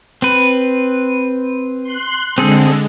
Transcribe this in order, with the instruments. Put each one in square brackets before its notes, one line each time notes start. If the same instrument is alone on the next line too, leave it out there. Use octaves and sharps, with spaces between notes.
[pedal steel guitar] C4 B4
[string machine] C6 F#6
[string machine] D3 G#3 [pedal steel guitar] C4 G#4 A4